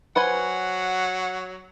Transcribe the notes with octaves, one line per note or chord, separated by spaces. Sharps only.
F#3 B4 C5 F#5 G#5